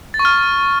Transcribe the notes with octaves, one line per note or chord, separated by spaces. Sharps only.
A6
C#6
F6